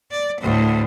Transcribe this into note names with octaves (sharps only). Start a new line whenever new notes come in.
D5
D2 A2